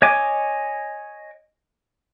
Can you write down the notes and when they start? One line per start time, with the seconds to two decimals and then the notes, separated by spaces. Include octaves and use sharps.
0.02 C#5 D#5 G#5 D6